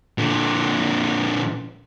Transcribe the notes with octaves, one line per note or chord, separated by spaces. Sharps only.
A#2 D3